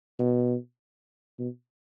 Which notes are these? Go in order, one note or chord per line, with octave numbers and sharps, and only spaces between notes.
B2
B2